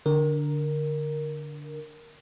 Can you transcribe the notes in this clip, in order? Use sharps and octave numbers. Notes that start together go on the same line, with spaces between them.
D3 A#4